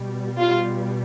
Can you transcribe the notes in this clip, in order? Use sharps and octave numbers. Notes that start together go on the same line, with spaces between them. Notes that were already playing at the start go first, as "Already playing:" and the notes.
Already playing: B2 G3
F4